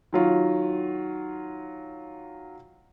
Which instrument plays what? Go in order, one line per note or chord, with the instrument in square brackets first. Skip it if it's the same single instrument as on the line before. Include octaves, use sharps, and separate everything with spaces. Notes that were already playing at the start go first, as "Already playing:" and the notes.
[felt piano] D#3 F#3 F4